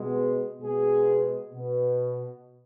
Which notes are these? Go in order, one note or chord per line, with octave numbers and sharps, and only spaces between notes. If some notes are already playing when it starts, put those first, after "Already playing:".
Already playing: B2 G#3 B3
B2 G#3 B3 G#4
B2 B3